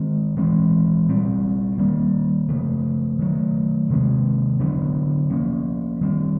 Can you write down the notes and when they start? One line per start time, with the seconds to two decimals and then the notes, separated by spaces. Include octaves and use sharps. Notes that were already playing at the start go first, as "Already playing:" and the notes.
Already playing: D#3 G#3 C4
0.37 E3 G#3 C4
1.08 A#2 G3 C4
1.78 D#3 G3 A#3
2.49 C#3 F3 A3
3.19 D#3 F#3 A3
3.90 C3 D#3 G#3 C4
4.59 D3 F#3 B3 D4
5.30 F3 A#3 C#4
6.01 D#3 G3 C4